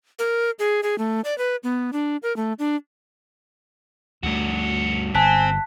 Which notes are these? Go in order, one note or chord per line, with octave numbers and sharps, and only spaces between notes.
A#4
G#4
G#4
A3
D5
B4
B3
D4
A#4
A3
D4
D2 G2 A3 F#4
G1 C4 G#5 A5 F#6 B6